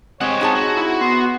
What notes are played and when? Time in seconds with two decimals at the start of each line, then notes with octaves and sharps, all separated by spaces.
0.21 G#3 C4 G4 C#5 F#5
0.41 D#4 G#4 A5
0.55 F#4
0.77 E4
1.01 B3 C6
1.21 F#5